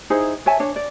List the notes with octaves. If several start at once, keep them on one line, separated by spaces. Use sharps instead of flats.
D#4 E4 G#4 C5
C#5 E5 G#5 A5
D4 C#5
D5